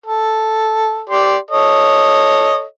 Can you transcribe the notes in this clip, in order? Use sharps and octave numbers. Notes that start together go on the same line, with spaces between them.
A4
G4 D5 C6
A4 C#5 D#5